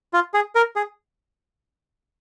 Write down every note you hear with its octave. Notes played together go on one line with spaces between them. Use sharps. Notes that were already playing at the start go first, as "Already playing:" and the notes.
F4
G#4
A#4
G#4